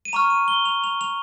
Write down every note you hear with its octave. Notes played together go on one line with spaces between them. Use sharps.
D#7
A#5 C#6 F6 F7
D#7
G7
F7
F7
F7